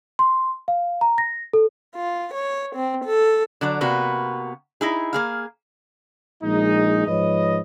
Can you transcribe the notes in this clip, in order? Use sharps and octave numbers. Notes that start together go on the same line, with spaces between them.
C6
F5
A#5
A#6
A4
F4
C#5
C4
A4
D3 F#3 D5
C3 A#3 B3 F#4
D#4 E4 G#4
A#3 G#4 F5
A#1 G#3 D#4
G#2 F3 B4 C#5 D#5